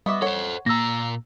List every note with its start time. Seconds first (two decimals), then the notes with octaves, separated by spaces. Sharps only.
0.06 G3 B3 F#4 D#5 E5 D6
0.22 A4 C5 C#5 F#5
0.66 A#2 A#3 A#5 E6 A#6